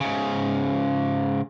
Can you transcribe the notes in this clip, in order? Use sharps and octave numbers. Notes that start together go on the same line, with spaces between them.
G#2 C#3